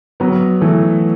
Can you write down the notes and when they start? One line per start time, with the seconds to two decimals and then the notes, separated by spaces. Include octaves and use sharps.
0.20 F#3 B3
0.61 E3 A3